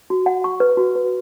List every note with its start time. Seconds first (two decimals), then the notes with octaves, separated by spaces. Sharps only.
0.10 F#4
0.26 F#5
0.44 C#6
0.60 B4
0.77 F#4
0.95 B4